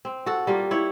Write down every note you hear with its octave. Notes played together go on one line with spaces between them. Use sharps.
C4
F#4 A4
G3 A#3 F4
E4 C#5